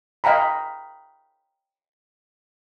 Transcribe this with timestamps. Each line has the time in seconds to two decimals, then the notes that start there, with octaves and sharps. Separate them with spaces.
0.24 D#5 F5 G5 A#5 B5